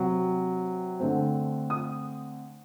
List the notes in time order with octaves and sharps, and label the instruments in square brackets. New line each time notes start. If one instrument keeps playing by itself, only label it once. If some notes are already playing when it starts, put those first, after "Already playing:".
Already playing: [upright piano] C3 F#3 C4
D3 A3 C4
D#6